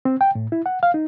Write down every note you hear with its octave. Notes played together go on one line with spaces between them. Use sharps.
C4
G5
A2
E4
F#5
F5
D#4